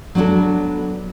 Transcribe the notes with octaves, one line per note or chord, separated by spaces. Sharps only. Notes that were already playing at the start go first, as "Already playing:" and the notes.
F#3 B3 D4 F#4 A4